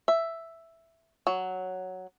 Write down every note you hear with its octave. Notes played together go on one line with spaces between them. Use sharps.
E5
F#3